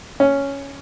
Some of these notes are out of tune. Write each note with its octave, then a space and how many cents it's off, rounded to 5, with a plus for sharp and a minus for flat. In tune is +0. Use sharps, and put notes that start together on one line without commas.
C#4 +0